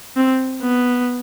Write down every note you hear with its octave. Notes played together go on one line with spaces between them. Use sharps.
C4
B3